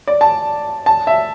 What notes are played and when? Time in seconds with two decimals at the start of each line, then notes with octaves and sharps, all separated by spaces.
0.07 D5
0.21 A5
0.86 A5
1.07 E5